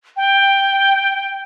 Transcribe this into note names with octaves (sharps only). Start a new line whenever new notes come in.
G5